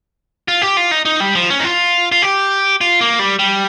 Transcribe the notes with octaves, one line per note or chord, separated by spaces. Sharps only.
F4
G4
F4
D#4
D#4
G3
F3
C#4
D#4
F4
F4
G4
F4
A#3
G3
G3